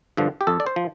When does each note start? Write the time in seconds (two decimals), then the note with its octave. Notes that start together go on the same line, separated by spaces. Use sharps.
0.17 G2 D3 F3
0.41 G4
0.47 F2 A4
0.60 D5
0.66 C5
0.76 F3